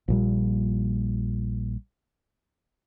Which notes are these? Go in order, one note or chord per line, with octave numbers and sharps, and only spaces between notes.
A#1 A#2 G3